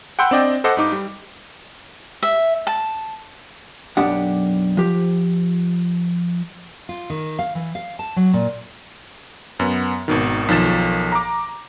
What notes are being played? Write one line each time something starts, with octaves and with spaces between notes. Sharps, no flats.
F#5 G5 B5 C6 E6 G6
C4 D4 D5 D#5 G5
A4 C5 D#5 F#5 D6
G2 D#4 D6
G3
E5
A5
B1 F#2 D4 G4 F#5
F3 G4
F4
D#3
F5
E3
F5
A5
F#3
A#2
F#2 B3
G#1 B2 D#3
B1 D#3 F3 A6 E7
A#5 D6